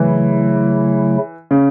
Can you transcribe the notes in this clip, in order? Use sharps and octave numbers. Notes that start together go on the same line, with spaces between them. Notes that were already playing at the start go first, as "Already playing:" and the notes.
Already playing: C#3 E3 F#3 A3 E4
C#3